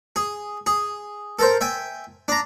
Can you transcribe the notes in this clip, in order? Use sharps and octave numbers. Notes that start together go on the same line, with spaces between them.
G#4
G#4
A4 A#4 C5
E5 G5 G#5
D4 A#5